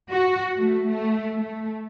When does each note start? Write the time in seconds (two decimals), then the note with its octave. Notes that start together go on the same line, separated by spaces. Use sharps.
0.11 F#4
0.59 A3
0.89 A3
1.35 A3